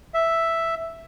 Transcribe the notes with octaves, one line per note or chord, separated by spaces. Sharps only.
E5